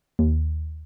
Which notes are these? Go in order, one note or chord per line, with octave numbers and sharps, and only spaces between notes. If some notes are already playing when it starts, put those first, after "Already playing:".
D#2